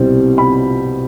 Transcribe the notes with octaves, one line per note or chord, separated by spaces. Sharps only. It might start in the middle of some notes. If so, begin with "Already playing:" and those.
Already playing: C2 B2 G3 C4
B5